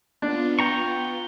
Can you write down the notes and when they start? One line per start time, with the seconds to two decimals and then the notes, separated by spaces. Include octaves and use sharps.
0.22 B3 D4 F4
0.59 G5 A#5 C#6